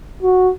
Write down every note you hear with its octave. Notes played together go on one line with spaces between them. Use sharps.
F#4